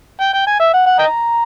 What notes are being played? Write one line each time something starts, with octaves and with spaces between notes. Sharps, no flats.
G5
G5
G#5
E5
F#5
F#5
D#5 G5 A#5